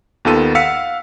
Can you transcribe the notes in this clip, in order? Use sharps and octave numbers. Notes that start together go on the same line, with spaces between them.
D#2 D#3 B3 F4 A4 D#7
F5 F#5 E6 B6 C#7